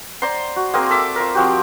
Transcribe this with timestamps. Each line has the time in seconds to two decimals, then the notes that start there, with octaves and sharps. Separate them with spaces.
0.22 C5 D5 A#5 C6
0.56 F#4
0.73 A#3 C4 G#4 A#4
0.90 A4 E5 D6
1.16 F4 A#4
1.35 F3 C4 F#4 G4